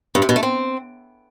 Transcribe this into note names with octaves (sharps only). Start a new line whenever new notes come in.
G2
C3
B2
A3
C4